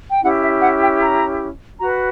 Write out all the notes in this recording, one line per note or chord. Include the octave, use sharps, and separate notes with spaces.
G5
C#4 E4 G4 F#5
E5
F#5
G5
A#5
F#4 B4 A#5